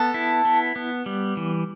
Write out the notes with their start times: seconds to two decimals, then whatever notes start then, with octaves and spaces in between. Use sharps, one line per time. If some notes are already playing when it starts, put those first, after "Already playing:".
Already playing: B3 A4
0.14 E4
0.45 B3
0.76 B3
1.06 G3
1.37 E3